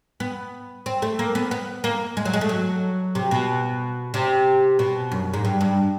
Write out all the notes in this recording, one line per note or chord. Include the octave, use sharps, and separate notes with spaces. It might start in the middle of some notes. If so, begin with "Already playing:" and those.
B3
C4
A3
A#3
B3
B3
A#3
G#3
F#3
G#3
A3
F#3
C3
B2
C3
B2
F#2
G#2
G2
G2